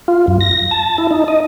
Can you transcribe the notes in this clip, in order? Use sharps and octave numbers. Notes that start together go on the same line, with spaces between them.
F4
F#2
A#6
A5
E4
D#4
D#5